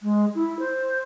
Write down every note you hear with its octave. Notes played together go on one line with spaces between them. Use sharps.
G#3
E4
C5